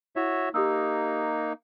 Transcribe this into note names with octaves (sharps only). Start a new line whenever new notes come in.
E4 F#4 C#5 E5
A#3 D#4 G4 D#6 E6